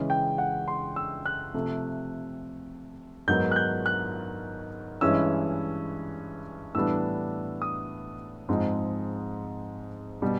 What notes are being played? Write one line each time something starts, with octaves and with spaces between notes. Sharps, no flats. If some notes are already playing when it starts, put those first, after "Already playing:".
Already playing: C#3 E3 G#3 C#4 E4
G5
F#5
C6
E6
F#6
C3 F3 A3
G#2 D#3 F#3 B3 G6
F#6
G6
F#6
G2 E3 G#3 C#4 E4 E6
A2 E3 G3 B3 D4 E6
D#6
G#2 F3 G#3 C4
B2 G3